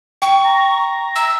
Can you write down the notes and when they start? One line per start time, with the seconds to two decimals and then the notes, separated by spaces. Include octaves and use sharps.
0.22 G5 C#6
0.45 A#5
1.16 E6